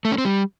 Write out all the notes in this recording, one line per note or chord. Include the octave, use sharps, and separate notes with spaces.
A3
C#4
C4
G3